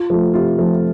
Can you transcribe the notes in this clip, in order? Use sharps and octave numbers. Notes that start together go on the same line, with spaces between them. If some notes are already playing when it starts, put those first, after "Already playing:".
Already playing: F4
F3 A3
C3 F4
F3 A3